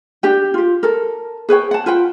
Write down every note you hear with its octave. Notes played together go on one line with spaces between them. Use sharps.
D4 G4 G5
F4 G4
A4 A#4
G#4 B4 C#5 G5
F#5 A5
F4 B4 F#5 G5